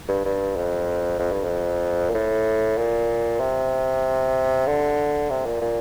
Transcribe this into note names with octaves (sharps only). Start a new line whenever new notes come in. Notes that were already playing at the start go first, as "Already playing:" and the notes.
G2
G2
F2
F2
G2
F2
A#2
A2
A#2
C3
D3
C3
A#2
A#2